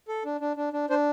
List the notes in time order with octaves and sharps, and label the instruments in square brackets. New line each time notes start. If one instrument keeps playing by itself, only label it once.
[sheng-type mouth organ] A4
D4
D4
D4
D4
D4 C5